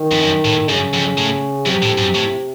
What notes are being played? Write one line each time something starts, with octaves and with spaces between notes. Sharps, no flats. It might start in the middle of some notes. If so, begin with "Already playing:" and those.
Already playing: D#3
F2
F#2
A2
F#2 C#3
F2
A2
F#2 C3
A2
F#2
A2